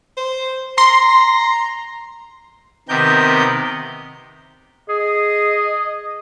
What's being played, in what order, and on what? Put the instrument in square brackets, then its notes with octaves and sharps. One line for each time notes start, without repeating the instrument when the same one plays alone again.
[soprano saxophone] C5
[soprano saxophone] A#5 [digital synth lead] C6
[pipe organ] C3 D#3 B3 G4 A#4 G6
[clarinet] G#4 [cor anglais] D#5